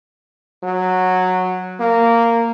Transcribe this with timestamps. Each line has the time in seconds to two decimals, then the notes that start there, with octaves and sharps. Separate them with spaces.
0.63 F#3
1.80 A#3